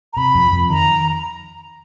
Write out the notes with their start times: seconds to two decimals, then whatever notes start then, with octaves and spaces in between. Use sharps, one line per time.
0.13 A#5
0.17 C3 B5
0.35 F2
0.52 F2
0.70 D#3 A#5